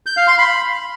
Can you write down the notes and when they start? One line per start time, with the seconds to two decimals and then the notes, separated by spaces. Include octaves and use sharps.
0.06 G6
0.17 F5
0.28 C6
0.38 B5